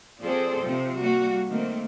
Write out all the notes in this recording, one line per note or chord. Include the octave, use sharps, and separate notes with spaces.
F3 C4 G#4 A4 C5 D5
C3 F3 C4
G3 A#3 F#4
D#3 A3 A#3 C4